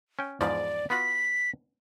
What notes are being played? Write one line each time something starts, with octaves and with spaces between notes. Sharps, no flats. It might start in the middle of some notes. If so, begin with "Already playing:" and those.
C#4 G5
E2 G#2 F3 D5
B3 F4 F#4 B6